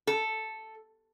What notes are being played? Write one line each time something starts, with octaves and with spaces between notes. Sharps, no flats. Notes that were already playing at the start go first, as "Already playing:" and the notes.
A4